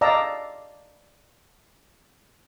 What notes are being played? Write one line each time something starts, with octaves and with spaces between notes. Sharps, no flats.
D5 D#5 F5 A5 A#5 E6